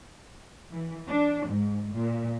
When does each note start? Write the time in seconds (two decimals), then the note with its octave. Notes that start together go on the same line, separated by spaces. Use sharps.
0.72 E3
1.08 D4
1.47 G#2
1.95 A#2